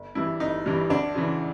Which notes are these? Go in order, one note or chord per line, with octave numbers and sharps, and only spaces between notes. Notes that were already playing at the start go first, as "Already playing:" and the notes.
Already playing: G1
G2 E3 G3 E4
G1 D#4
G2 E3 G3
D2 D4
C#3 E3